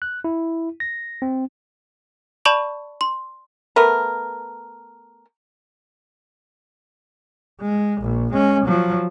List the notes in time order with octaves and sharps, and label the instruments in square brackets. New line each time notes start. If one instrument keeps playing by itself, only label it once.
[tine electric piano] F#6
E4
A#6
C4
[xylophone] D5 A5 B5 C#6 E7 F7
C6
[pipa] A3 B3 A#4
[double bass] G#3
A#1
G#3 C#4
F3 F#3